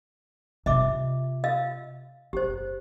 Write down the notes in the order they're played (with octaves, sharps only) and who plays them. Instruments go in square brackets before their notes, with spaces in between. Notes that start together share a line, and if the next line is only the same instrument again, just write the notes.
[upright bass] C3 F4 [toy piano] D#5 E5 D6
[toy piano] D#5 F5 E6
[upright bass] F#1 [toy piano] G4 C5